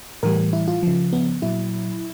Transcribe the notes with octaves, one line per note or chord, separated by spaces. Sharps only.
A2 E3 G3 A#4
E4
F4
C#3 F3
B3
A#2 F#3 E4